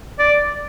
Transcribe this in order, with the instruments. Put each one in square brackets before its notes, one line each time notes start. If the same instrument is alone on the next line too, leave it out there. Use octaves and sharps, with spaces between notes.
[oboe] D5